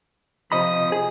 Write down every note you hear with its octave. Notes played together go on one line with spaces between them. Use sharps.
C3 F3 D#5 B5 D#6
G#4